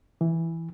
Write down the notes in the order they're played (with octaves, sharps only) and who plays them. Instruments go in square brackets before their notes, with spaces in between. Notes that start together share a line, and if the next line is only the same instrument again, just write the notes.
[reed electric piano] E3